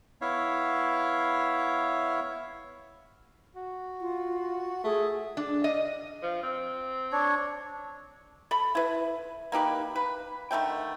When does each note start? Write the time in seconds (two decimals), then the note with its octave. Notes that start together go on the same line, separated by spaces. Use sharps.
0.21 B3 E4 C#5 E5 F5
3.55 F#4
4.01 F4
4.84 A3 G#4
5.37 D4
5.64 D#5
6.22 F3
6.43 C4
7.12 D4 C#5
8.51 A4 B5
8.75 E4 B4
9.52 A#3 D#4 G4 B4
9.96 B4
10.51 D3 D#3 A3 G5